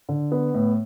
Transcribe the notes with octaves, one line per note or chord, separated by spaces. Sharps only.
D3
B3
A2